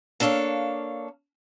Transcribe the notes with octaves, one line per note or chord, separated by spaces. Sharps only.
A#3 D4 A4 C#5 F5